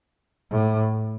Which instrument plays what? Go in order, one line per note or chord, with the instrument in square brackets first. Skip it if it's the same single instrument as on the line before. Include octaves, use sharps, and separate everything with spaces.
[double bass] A2